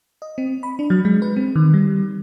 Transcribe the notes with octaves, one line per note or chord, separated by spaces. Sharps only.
D#5
C4
B5
D4
F#3
G#3
B4
C4
D#3
G3